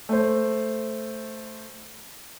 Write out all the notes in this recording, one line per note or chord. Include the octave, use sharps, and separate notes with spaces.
A3 C5